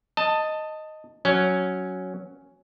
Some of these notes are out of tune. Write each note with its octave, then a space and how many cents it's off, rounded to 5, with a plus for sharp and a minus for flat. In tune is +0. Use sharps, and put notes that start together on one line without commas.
D#5 +0 A5 +15
F#3 +0 C#4 +0